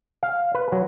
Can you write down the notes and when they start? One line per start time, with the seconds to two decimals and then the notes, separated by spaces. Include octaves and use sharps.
0.23 F5
0.55 B4
0.72 F#3